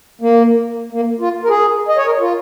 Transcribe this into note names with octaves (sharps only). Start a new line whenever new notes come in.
A#3
A#3
F4
A#4
G#4
D#5
C#5
A#4
F4